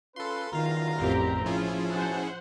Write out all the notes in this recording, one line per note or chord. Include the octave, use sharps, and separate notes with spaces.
C#4 F4 A4 B4 C6
F#1 E2 D#3 F4 F5 A#5
A1 F2 C4 G4 A#4
F3 C#4 E4 F4 G#4
B2 C5 F#5 G#5 A5